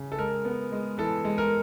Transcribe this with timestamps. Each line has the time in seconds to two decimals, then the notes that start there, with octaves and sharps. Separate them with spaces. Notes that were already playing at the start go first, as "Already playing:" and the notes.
Already playing: C#3
0.12 A4
0.19 G#3 A#4
0.45 B3
0.72 G#3
0.98 E3 A4
1.25 G#3
1.38 A#4